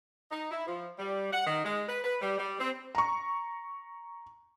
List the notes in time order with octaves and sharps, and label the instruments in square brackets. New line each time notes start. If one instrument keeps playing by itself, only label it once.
[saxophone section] D#4
E4
F3
G3
F#5
D#3
G#3
B4
B4
G3
G3
C4
[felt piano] A#5 C#6